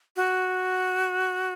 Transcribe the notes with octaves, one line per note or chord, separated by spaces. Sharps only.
F#4